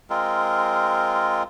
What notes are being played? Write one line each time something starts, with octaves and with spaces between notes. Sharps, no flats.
G#3 C4 F4 A#4